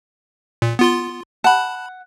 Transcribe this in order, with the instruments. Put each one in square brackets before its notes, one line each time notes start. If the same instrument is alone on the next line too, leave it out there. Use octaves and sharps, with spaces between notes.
[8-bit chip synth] A#2
B3 F4 C6
[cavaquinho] F#5 [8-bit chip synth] A5 B5